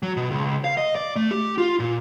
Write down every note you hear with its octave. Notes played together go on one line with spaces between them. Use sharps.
F#3
B2
C#2
F5
D#5
D5
A3
G4
F4
A#2